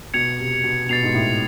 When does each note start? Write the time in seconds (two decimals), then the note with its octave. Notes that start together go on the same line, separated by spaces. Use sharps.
0.14 B2 G#6 C#7 F7
0.39 C3
0.64 B2
0.89 B2 A6 C7 F7
1.03 G#2
1.15 A2